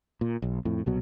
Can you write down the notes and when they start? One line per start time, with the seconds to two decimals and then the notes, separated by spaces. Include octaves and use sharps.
0.21 A#2
0.42 B1
0.65 F2 A2
0.86 C2 B2 F#3